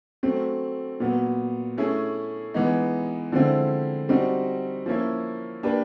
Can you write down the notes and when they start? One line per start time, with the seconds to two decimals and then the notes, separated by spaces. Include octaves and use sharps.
0.23 F#3 A3 C4
1.00 A#2 F#3 B3
1.78 A3 C#4 E4 G#4
2.54 E3 G#3 B3 D#4
3.32 D3 F3 G#3 C4 E4
4.09 G3 C4 D#4 F#4
4.86 F3 A#3 C#4 E4
5.63 A#3 D4 G4 B4